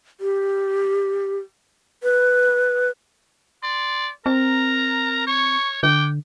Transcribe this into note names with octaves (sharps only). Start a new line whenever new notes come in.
G4
B4
D5 C6
C4 A#4 A#5
C#5 C#6
D3 G5 D6